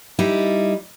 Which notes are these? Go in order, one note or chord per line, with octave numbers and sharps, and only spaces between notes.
G3 D#4 E4